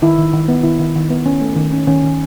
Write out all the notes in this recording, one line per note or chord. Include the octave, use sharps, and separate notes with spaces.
D#3 E4
D#3
D#3
B3
D#3 E4
D#3
D#3
B3
C#4
A3
D#3
C#4
D#3 C#4
D#3